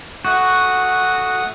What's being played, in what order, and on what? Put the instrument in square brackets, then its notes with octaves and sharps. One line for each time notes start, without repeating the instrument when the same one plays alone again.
[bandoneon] A3 F#5 D#6 [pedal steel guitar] F#4